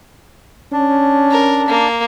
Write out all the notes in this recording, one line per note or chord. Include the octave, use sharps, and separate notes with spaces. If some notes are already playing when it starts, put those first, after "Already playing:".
C#4 D4
A#4
A#3